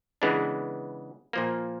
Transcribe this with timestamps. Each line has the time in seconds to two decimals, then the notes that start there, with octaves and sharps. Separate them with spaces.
0.22 C#3 E3 G#3 B3 D4
1.33 A#2 F3 A#3